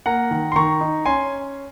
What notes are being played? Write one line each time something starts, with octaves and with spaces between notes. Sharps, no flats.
A#3 F#5 A#5
D#3
C6
D#3 A#5 C#6
D#4
C#4 G#5 C6